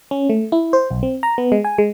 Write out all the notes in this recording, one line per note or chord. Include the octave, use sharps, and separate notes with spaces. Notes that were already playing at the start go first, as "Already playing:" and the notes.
C#4
A3
E4
C5
B1
C4
A#5
B3
G#3
G#5
G#3